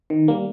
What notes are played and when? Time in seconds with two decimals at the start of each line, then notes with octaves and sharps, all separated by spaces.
0.10 D#3
0.28 G3 A#3